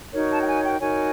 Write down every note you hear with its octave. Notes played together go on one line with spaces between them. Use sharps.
D#4 F#4 A#4 C#5
A5
G5
G#5
G5
D#4 F#4 A#4 C#5 G#5